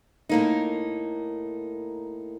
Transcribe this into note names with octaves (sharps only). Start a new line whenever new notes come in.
A2 A#3 D#4